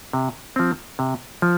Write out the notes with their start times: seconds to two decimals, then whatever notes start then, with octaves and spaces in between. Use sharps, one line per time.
0.13 C3
0.56 F3 C4
0.99 C3
1.42 F3